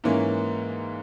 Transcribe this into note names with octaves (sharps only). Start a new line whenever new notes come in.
G#2 E3 A#3 C#4